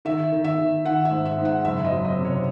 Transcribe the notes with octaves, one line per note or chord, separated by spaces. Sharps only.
D#3 E5
D#3
E5
D#3
D#3 F#5
E5
G#2
E5
G#2
F#5
F#1 E5
D#5
F#3
D#5
C3
C#5